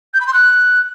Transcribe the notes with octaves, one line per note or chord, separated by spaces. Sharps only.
G6
B5
C6
F#6